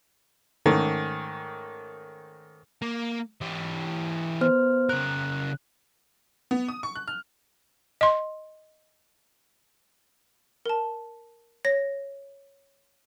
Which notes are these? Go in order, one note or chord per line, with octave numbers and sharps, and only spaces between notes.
G#2 D#3 A3 C#4
A#3
E3 G4
B3 C5 F6
C#3 A#4 F#6
B3
D#6
C#6
F#6
F6
D#5 C6
A#4 A5
C#5 A#6